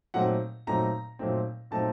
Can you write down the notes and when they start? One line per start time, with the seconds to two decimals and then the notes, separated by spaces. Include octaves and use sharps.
0.14 A#2 F#3 A3 C4 D#4 F#5
0.67 A#2 F#3 A3 C4 D#4 A#5
1.19 A#2 F#3 A3 C4 D#4
1.71 A#2 F#3 A3 C4 D#4 A5